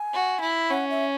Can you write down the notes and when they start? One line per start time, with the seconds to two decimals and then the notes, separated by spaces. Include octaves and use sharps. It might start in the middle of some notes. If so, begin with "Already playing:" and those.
Already playing: G#5
0.14 F#4
0.41 E4
0.70 C#4 F#5
0.90 E5